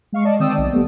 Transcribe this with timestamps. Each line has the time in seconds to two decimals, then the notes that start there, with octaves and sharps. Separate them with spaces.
0.12 G#3 F5 C#6
0.25 D5 D#5 A5
0.40 D#3 C4 D5 G5 D#6 E6
0.58 B1
0.72 G3 A3 B3